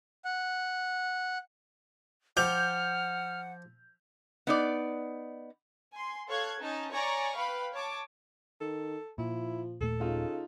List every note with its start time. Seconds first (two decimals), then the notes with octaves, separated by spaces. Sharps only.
0.25 F#5
2.37 F3 F#5 G5 D6 F6 G6 F7
4.47 B3 D#4 D5
5.94 G#5 C6
6.28 A4 C#5 F5 F#6 G#6
6.60 C#4 D#4 A5
6.92 C#5 D5 G#5 A#5 C#6
7.36 B4 F5 G5 B5
7.73 C#5 A5 D6
8.61 D#3 A4
9.18 A#2 F3 E4
9.81 D#1 A#2 A3 A4
10.00 C#3 D#4 F4